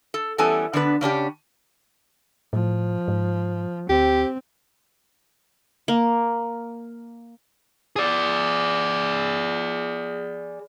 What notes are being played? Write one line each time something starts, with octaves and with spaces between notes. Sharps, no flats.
A4
E3 G3 B3 C#4 A4 G#5
D3 B3 D4 B4
C#3 C#4 D4 G4
A2 F3
G#2
D2 C4 G4
A#3
G#4 D5